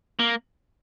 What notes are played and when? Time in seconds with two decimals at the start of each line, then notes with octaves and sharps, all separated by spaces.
0.19 A#3